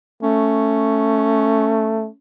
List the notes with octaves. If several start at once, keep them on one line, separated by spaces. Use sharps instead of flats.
A3 C#4